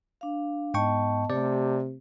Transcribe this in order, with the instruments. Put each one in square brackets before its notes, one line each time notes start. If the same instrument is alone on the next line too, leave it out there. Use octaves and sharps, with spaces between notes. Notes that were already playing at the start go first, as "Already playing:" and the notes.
[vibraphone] D4 F5
[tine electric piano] G#2 G5 C#6 [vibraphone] B3 D#5 A5
[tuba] C3 [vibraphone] A3 G4 [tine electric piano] D5